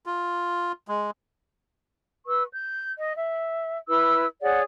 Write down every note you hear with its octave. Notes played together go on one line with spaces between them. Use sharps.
F4
G#3
B4 C#6 E6
G6
D#5
E5
E4 B4 E6
G#4 C#5 D5 F#5